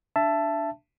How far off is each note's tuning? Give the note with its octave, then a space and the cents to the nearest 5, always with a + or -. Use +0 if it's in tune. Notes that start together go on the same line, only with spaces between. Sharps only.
D4 +0 E5 +20 A5 +0